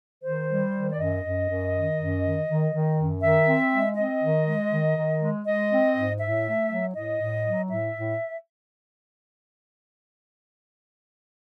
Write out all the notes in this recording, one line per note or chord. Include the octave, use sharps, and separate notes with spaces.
D#3 C5
G3
D#3
D5
F#2 D#5
F#2
F#2
D#3
F#2
D#3
D#3
D#3
F#2
D#3 E5
C4
G#3
C4 D#5
D#3
G#3
D#3
D#3
G#3
G#3 D#5
C4
G#2
A2 E5
A3
F#3
A2 D#5
A2
F#3
A2 E5
A2